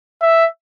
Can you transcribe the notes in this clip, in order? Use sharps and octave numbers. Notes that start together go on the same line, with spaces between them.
E5